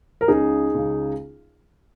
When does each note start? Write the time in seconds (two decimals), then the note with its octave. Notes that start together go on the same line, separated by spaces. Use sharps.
0.21 A#4
0.28 C#2 C#3 D#4 G#4
0.74 C#2 C#3